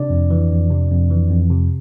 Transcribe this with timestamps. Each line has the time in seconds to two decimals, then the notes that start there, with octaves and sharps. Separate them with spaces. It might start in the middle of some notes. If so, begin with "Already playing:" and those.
Already playing: C3 D4 D5
0.10 F2
0.30 E3
0.51 F2
0.70 C3
0.91 F2
1.10 E3
1.30 F2
1.50 C3